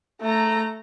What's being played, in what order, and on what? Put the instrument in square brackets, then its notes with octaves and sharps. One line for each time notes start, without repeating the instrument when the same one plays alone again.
[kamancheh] A3 A#5